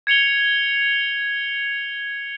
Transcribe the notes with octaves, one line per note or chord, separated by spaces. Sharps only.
G#6 C#7 F7 G7